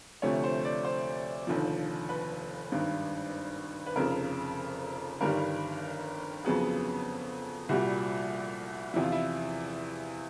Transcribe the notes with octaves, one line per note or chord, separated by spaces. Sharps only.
D2 C3 F3 A3 C#5
C5
D5
C5
F1 D#2 D3 F3
B4
G#1 G2 D#3
B4
F1 F2 C#3 A#4
G1 G2 D#3 G3 A#4
F2 C#3 F#3 B3 G#4
C2 A#2 G3 F#4
E2 C3 F3 E4
F4
E4